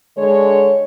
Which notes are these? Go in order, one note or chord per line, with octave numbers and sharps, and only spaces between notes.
D3 G#3 D4 C#5